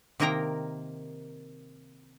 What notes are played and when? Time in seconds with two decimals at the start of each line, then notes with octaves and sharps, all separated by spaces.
0.20 C3 D#3 A#3 A#4 G5 A#5